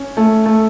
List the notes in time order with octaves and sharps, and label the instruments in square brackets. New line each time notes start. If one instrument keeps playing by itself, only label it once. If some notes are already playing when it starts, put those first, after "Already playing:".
Already playing: [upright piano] C#4
A3
A3